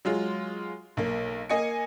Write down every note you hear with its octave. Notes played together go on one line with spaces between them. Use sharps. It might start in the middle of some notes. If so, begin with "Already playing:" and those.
F#3 G#3 F4
B1 A#3
A#3 D#5 G#5 C#7